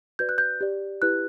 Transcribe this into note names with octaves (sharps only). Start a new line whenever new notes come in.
F#4 B4 D5 G6
F#6
G6
G4 D5
E4 G4 B4 F#6